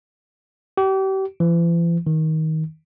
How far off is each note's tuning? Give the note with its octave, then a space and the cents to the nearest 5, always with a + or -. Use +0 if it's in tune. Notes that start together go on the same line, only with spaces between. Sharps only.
G4 -35
E3 +45
D#3 +20